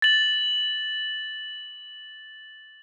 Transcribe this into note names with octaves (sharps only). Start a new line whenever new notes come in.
A6 F#7